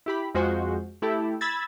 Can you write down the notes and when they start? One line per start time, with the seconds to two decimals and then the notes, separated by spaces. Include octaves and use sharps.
0.06 E4 G4 B5
0.35 F2 G#3 F4 F#4 C5
1.02 A3 E4 G4 A4
1.41 B5 E6 G#6 A6